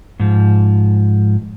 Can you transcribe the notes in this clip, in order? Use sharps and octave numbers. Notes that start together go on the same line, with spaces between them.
G#2 F3